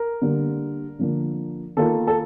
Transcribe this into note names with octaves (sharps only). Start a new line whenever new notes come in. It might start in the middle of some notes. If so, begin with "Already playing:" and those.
Already playing: A#4
D3 G3 A#3
D3 F3 A#3 D4
D#3 A#3 F4 A4
A4